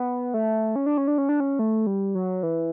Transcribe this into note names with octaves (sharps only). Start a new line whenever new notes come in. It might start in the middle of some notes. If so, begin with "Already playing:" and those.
Already playing: B3
A3
C#4
D4
C#4
D4
C#4
D4
C#4
A3
G3
F#3
E3